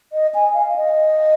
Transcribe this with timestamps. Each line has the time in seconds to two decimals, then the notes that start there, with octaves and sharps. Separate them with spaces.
0.13 D#5
0.35 G#5
0.54 F5
0.76 D#5